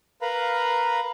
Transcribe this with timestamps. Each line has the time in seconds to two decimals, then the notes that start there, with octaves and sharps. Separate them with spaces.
0.22 A#4 B4 F5 A#5 B5